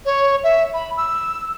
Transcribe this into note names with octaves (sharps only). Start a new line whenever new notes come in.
C#5
E5
B5
E6